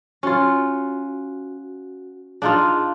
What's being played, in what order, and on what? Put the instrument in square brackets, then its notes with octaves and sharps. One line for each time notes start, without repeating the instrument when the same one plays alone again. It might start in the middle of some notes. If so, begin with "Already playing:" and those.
[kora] C#4 F4 [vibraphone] F#4
[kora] D4 D#4 F4 [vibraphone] G#4 F5